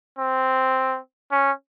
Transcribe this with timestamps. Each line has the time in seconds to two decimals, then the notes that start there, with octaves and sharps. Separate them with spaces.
0.19 C4
1.31 C#4